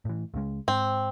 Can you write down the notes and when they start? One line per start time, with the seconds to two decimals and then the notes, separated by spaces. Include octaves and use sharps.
0.05 A2 E3
0.34 C#2 C#3 G#3
0.68 G#2 C4